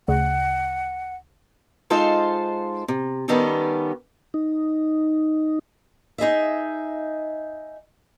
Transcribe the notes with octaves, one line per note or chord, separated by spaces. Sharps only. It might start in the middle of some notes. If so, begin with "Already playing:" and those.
D2 C#3 F#5
G#3 D#4 F4 A4 C5 F5
C3
D#3 G3 B3 C#4 G4 A4
D#4
D#4 G#4 D#5 E5